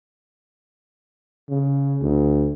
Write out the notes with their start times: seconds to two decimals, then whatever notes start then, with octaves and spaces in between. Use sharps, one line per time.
1.49 C#3
2.02 D2